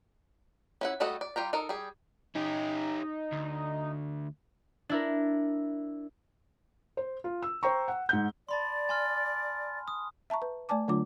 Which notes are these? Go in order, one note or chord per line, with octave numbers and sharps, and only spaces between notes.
C#4 E4 F#5
G3 A3 F#4 A4 D#5
D5
G3 F4 G4 A#5
D#4 A4 A#4
G3 G#4
C#4 D#4 G4
D2
D4 E4 A#4
C5
F4
E6
C5 G5 A#5 C#6
F#5
G#2 F#5 G6
D5 A5 B5 C6
G#5 C6 F6
D#6
E5 A5 A#5 C#6
B4
A3 D5 G#5 A5 D6
D3 F#3 A3 D4 F4 D6